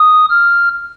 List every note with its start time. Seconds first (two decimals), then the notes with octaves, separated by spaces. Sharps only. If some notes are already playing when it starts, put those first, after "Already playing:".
Already playing: D#6
0.30 F6